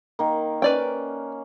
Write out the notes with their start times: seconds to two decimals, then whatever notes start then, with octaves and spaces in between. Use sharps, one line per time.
0.19 D#3 A#3
0.62 C#4 B4 D5 G5